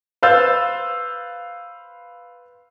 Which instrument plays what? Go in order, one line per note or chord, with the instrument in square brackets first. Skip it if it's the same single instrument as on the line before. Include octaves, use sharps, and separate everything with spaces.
[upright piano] B4 C5 F5 E6 G6 A6